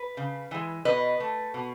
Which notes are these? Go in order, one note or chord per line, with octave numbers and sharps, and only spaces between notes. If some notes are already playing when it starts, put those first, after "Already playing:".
Already playing: B4
C#3
E3 G#3
B2 B4 D#5
A3
B2